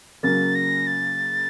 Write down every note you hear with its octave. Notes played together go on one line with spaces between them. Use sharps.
C#3 F#3 A#3 A6
A#6
A6